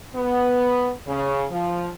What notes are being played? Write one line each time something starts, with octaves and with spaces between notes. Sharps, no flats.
B3
C#3
F3